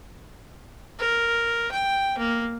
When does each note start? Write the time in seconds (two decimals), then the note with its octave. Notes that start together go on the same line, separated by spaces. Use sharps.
0.99 A#4
1.72 G5
2.18 A#3